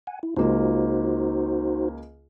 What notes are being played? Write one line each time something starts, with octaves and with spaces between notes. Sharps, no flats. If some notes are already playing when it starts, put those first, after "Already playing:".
F#5 G#5
E4
C#2 A#3 D#4 F4 F#4 C5